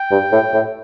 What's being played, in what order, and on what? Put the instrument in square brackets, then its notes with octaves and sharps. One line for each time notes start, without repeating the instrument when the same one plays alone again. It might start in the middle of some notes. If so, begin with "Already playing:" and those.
Already playing: [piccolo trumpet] G5
[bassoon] G2
A2
A2